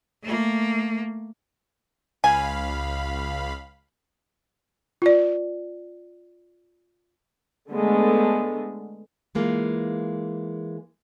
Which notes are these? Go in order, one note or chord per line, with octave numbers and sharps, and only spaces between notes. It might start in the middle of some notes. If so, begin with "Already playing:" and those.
A3 A#3
C#2 F5 G#5 B5
F4 D5
D3 G#3 A3 B3
E3 G#3 A#3 F4